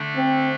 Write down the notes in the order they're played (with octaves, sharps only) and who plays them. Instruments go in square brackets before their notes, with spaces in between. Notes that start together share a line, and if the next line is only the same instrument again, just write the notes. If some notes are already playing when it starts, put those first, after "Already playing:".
Already playing: [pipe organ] D3 A3 D4
[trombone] C4